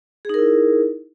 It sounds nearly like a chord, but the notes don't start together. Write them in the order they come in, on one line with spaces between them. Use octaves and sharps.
G#4 D#4 A#4 E4